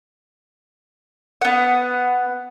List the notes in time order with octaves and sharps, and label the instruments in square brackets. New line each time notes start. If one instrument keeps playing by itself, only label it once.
[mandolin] B3 F#5